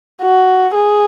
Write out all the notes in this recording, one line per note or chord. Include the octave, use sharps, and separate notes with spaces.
F#4
G#4